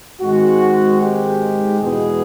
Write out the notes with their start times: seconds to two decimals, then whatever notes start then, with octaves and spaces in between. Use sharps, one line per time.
0.22 G#2 D#3 G#3 C4 F#4
1.01 G4
1.80 E2 B2 G#3 G#4